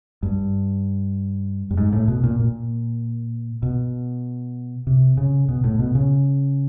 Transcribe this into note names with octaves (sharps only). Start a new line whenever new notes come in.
G2
G2
G#2
A2
B2
A#2
A#2
B2
C3
C#3
B2
A2
B2
C#3